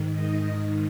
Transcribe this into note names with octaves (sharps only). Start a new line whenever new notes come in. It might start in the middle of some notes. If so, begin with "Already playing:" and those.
Already playing: G#2 D#3
D#5